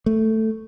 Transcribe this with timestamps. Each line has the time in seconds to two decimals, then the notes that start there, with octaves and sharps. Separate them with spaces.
0.06 A3